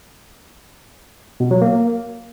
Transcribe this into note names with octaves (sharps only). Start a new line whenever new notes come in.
B2
F#3
A#3